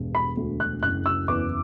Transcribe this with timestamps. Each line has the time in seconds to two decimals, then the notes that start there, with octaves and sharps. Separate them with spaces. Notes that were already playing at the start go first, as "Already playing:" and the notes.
Already playing: E1 G2
0.15 B5
0.37 D2
0.60 F#6
0.83 F#1 F#6
1.06 E6
1.28 E2 D6